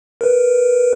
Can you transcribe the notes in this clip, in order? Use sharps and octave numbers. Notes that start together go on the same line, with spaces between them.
A#4 B4